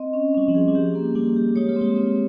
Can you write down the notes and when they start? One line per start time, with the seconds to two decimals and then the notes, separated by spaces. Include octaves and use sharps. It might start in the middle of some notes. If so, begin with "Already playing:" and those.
Already playing: C4 D#5
0.13 C#4
0.34 G3 C#4
0.48 F3
0.55 G#4
0.68 G3
0.75 F3 G4
0.95 A#3
1.15 G3 A#3
1.36 G4
1.56 G#3 C#5
1.69 A#3
1.76 G#3 C4
1.97 C4